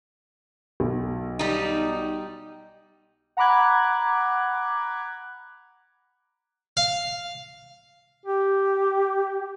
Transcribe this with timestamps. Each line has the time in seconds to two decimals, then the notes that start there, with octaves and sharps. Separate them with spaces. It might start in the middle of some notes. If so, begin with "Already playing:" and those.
0.80 B1
1.39 G3 D#4
3.37 F#5 A#5 B5 D6 F#6 G#6
6.77 F5
8.26 G4